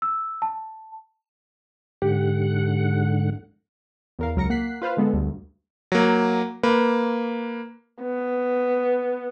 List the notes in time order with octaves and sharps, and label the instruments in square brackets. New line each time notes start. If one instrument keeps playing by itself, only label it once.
[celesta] E6
A5
[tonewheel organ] G#2 D3 F#5 [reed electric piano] G4
[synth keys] E2 A#4 F5
C#2 F#3 A#4 A#6 C#7
A#3 F#5 F#6 B6 C7
F4 B4 C5 F5
D3 G#3 B3 A4
D2 G2
[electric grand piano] F#3 A#3
A#3 B4
[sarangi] B3